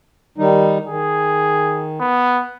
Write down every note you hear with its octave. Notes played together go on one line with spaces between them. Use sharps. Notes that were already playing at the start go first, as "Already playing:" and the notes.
D#3 G3 D#4
D#3 G#4
B3